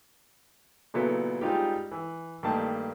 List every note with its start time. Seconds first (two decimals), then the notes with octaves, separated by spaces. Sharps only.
0.94 A#2 C#3 F#3 B3 E4 A4
1.41 G3 G#3 C4 D#4 F4 G4
1.92 E3
2.43 G2 D#3 A3 A#3 G4 A5